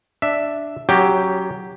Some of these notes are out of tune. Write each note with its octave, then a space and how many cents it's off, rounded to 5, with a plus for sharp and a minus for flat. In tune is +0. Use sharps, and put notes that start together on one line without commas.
D4 +0 E5 +0
F#3 +15 C#4 +0 G4 +0